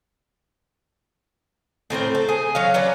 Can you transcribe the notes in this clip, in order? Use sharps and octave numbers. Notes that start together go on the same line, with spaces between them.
A2 C4 A#4 C5
A4
G#4
F#3 C#5 F5
F#3 C#4 B4 D5